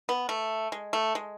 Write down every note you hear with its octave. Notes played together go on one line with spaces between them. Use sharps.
B3
A3
G#3
A3
G#3